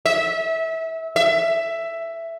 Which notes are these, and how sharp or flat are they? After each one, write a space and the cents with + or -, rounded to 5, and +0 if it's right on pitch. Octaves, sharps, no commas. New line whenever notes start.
E5 -25
E5 +10